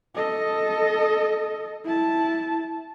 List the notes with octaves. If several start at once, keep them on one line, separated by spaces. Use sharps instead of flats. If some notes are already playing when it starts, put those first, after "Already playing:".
A4 D#5
E4 A5